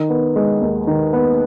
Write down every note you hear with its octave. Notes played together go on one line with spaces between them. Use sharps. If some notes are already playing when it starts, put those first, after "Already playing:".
Already playing: D#3
B3
G#3
D#2
D#3
B3